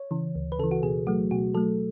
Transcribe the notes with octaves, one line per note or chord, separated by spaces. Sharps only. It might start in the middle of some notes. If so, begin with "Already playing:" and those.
Already playing: C#5
C#3 E3
D2
B4
C#3 E3 A4
F#4
B2 G#4
F#3 A3 F#4
B2 F#4
F#3 A3 A4